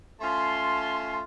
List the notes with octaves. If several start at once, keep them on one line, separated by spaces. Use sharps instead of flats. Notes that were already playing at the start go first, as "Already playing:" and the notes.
A3 C#4 F4 A5 C6